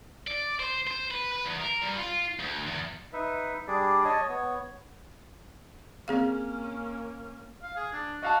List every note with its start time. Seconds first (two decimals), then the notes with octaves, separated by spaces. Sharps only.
0.27 D5
0.60 C5
0.87 C5
1.11 B4
1.32 B4
1.45 E2
1.61 A#4
1.81 G2
1.98 F4
2.40 D2
2.67 E2
3.13 D#4 B4 E5
3.68 G3 D4 G#4 D5
4.05 C#5 D#5 A5
4.29 B3 C#5
6.08 A#3 C4 C#4 G#4 F5
7.63 F5
7.76 G#4
7.93 D4
8.23 F#4 D#5 F5 A5